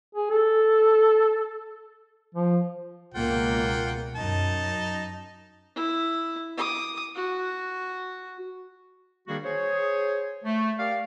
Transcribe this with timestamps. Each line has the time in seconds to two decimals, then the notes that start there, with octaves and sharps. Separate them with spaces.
0.15 G#4
0.30 A4
2.35 F3
3.14 C#2 B2 A#3 F4 F#5 G5
4.15 F#2 D#4 A5
5.76 E4
6.57 D6 D#6
7.15 F#4
9.28 D#3 G3 A#3 D4 F#4 G#4
9.44 G#4 C5 C#5
10.45 A3
10.79 G4 A#4 D5 F5